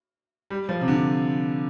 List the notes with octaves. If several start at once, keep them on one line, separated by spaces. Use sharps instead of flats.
G3
F3
C3
D3